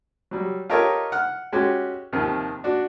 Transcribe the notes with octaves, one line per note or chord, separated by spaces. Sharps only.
F#3 G3
F4 G4 A4 A#4 C#5 D#5
F#5 F6
G#3 C#4 F#4 G4
D#2 C3 D#3 F3
D4 F#4